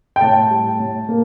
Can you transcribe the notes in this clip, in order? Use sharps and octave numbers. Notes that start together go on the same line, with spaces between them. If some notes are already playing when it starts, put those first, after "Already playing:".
G5
A2 A5
G3
A2
A#3